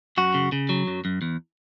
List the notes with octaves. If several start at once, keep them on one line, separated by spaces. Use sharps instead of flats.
F#2 F#4
C#3
C#3
F#3
F#2
F#2
E2